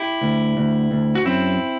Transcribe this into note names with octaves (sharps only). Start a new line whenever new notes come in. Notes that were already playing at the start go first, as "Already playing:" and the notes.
Already playing: E4 G4
D2
D2
D2
F#4
F#2 C4 E4